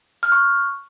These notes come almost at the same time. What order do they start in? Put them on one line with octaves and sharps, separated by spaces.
F6 F#6 C#6